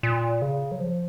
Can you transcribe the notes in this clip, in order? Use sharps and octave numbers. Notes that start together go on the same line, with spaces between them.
A#2
C#3
F#3
F3